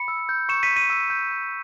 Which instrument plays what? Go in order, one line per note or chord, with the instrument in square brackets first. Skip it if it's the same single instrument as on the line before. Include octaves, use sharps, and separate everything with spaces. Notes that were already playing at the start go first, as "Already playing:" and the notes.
Already playing: [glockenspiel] B5 C#7
E6
G6
C#6 C#7 E7
B6 D#7
G6
B6 D#7
E6
G6
G6